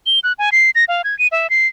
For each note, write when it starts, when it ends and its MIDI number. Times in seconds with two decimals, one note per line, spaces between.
0.06 0.19 103
0.24 0.33 90
0.39 0.50 80
0.52 0.70 96
0.75 0.85 94
0.88 1.02 77
1.04 1.17 92
1.19 1.27 99
1.32 1.50 76
1.50 1.67 96